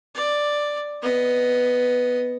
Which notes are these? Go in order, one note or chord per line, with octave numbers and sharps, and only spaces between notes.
D5
B3 D#5